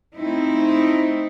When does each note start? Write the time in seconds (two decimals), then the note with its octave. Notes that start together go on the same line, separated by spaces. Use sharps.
0.16 A3 C4 D#4 E4